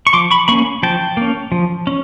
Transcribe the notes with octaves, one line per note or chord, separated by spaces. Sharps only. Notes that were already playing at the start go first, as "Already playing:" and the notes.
C#6
F3 C6 D6
B5 C#6
A#3 C#4 B5 C#6
F3 G5 A5
A#3 C#4
F3
C#4